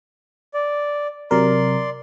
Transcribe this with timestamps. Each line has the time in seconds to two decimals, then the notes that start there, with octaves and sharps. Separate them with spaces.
0.54 D5
1.31 C3 F#3 A#4 D5 C6